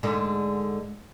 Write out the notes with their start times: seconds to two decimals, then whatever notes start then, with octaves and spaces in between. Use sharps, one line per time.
0.03 G#2 D3 G#3